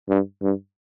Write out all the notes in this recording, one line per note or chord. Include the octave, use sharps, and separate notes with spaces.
G2
G2